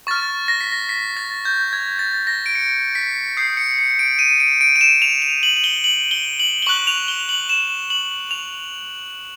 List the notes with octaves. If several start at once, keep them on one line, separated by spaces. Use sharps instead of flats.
C#6 F6 A6
A#6
B6
A#6
B6
A6
G6
G#6
A6
A#6
D7
C#7
B6
D#6 G6 C7
C#7
C#7
D7
D#7
D7
D7
D#7
E7
F7
F7
F#7
F#7
G7
F#7
G7
F#7
G7
C#6 F#6 F#7
F7
G7
F7
F#7
E7
F#7
F7